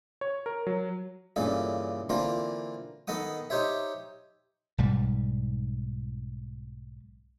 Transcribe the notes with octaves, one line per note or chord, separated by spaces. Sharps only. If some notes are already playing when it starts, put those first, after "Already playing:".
C#5
A#4
F#3
G2 A#2 C#3 E3 A4
D3 E3 A#3 C4 F4 A#4
D#3 B3 A4 D#5 F#5 D#6
D#4 G4 C5 C#5 E5
B1 G#2 G3